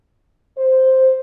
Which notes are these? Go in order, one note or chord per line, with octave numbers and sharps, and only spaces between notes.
C5